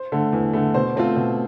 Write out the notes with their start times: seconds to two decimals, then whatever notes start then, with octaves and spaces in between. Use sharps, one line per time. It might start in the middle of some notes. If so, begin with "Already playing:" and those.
Already playing: C5
0.12 D3 A3
0.33 E2
0.53 D3 A3
0.74 B2 C5
0.96 A3 C4 F4
1.16 B2